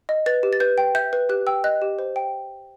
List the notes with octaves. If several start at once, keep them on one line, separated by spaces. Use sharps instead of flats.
D#5
B4 A6
G4
A6
B4 G6
G5
E5 G6
B4
G4 F#6
G5 E6
D#5 F#6
G4
C5
G5